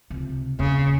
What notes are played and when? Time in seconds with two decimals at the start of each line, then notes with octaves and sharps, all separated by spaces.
0.10 C#2 C3
0.59 D#1 C#3